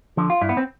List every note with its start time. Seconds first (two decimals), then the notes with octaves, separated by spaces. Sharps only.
0.17 D3 F3
0.30 F4
0.41 G2 E4
0.49 B3
0.57 C4